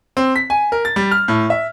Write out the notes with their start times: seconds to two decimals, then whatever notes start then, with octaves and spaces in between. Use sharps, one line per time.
0.17 C4
0.36 B6
0.50 G#5
0.72 A#4
0.85 A6
0.96 G3
1.11 F6
1.28 A2
1.50 E5